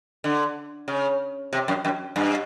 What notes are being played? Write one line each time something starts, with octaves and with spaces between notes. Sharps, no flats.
D3
C#3
C3
F#2
F#2
G2